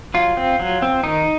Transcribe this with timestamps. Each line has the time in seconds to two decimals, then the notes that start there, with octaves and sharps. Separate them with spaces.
0.14 F#3 F4
0.37 C4
0.60 F#3
0.82 C4
1.04 D#3 D#4